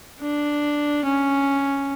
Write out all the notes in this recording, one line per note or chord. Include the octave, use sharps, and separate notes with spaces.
D4
C#4